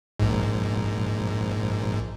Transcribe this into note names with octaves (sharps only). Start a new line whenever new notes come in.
A#1 G#2